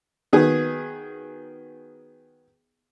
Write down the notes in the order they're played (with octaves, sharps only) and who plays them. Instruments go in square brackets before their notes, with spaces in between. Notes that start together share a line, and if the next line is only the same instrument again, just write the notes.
[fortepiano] D#3 F#3 B3 G#4 B4